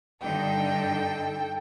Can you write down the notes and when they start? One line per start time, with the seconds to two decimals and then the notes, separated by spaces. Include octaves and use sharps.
0.23 G2 D3 D#4 A4 G5